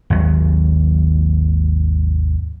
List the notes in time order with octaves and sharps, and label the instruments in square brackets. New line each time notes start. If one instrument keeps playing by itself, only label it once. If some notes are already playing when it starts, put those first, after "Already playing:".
[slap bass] G#1 D#2 F#3